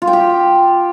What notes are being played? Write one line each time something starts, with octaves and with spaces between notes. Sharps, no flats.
F4
G5
G4